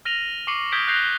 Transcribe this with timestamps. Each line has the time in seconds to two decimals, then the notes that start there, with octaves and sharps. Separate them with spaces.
0.05 F6 A#6 D#7 F7 F#7
0.47 C#6 D6 C7 C#7 F#7
0.72 D#6 F6 G6 G#6 B6 D7
0.88 F#6 G6 A#6 C7 F7 G7